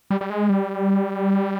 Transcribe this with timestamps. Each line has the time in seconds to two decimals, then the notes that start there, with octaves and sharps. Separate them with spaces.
0.10 G3
0.21 G3
0.30 G#3
0.50 G3